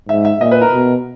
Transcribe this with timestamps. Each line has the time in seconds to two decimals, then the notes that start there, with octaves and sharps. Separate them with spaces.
0.09 G#2 E5
0.25 E5
0.41 A#2 D#5
0.51 B4
0.61 A#4
0.72 B2